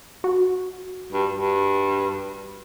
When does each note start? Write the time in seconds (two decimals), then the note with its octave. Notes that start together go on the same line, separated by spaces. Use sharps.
0.24 F#4
1.12 G2
1.34 G2